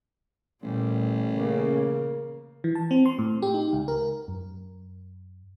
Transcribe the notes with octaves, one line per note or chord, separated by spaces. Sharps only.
A1 A#2 G3
C#3 A#3
E3
A5
C4
C6
A2
G4
D#4
C#2
A#4
F#2